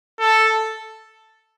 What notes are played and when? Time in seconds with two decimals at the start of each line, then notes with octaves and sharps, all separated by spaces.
0.20 A4